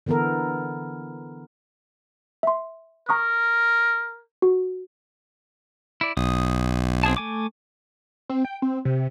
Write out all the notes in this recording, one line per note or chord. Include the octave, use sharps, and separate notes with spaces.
D3 E3 B3 A4 A#4
E5 C6
A#4 A#5 C#6 D#6
F#4
E4 D5
B1 D#6
C4 G#4 A5
A3 G#5 D6
C4
G5
C4
C3